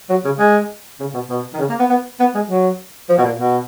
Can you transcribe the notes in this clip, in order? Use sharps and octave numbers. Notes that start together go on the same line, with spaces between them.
F#3
C#3
G#3
C#3
B2
B2
D#3
C#3
A#3
B3
B3
B3
G#3
F#3
F3
B2
A#2
B2